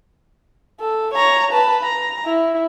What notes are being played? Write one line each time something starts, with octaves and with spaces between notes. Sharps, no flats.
A4
C#5 A#5
B4 A5
A#5
E4